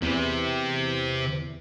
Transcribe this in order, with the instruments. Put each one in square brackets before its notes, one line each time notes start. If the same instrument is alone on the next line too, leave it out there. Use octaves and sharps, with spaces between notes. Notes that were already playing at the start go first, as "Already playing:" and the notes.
[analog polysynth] E2 E3 [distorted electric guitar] C3